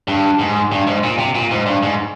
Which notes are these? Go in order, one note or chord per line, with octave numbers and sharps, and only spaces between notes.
G2
G#2
G2
G#2
A#2
C3
A#2
G#2
G2
G#2